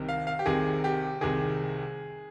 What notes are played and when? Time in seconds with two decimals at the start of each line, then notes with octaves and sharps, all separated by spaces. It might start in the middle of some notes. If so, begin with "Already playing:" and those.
Already playing: C2 C3 D#3
0.09 F5
0.27 F5
0.39 G4
0.46 C2 C3 D#3 G#4
0.84 G4
1.21 C2 C3 D#3 G#4